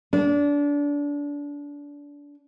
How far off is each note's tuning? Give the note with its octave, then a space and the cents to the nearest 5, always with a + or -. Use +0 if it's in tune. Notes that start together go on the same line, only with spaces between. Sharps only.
D4 -25